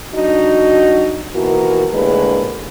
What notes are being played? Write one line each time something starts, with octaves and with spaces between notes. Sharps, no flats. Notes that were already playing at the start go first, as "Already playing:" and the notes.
F#3 D4 D#4 F#4
D#2 B2 E3 F#4 A#4
D#2 A2 D3 G#3 A#4 B4